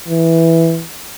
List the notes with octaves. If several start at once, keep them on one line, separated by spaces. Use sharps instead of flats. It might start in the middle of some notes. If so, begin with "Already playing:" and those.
E3